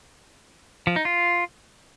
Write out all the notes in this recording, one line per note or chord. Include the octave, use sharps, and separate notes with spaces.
F3
D#4
F4